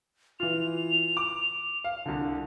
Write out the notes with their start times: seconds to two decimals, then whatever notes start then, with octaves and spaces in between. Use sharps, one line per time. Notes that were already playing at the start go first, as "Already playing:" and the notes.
0.40 E3 F4 F7
1.17 D6
1.84 F5
2.06 C2 D3